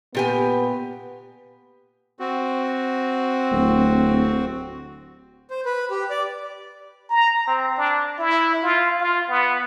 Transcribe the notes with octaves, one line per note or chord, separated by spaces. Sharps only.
A#2 B3 G4 G#5
C4 F#4
D1
C5
B4
G4
D5
A#5
C4
D4
E4
F4
F4
B3